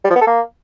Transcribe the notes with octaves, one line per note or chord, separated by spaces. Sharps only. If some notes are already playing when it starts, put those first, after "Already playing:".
G3
F3
B3
A4
A#3